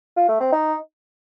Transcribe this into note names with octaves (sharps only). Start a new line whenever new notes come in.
F4
A3
C4
D#4